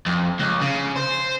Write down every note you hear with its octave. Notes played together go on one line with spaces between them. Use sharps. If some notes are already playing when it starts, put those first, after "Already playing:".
F2
C#2
C#3
C5